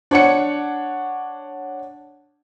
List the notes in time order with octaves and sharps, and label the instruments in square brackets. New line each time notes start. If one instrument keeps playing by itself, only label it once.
[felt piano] D4 C#5 F#5 C#7